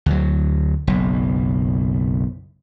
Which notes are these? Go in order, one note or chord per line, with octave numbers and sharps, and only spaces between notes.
D2 F#3
F#1 B1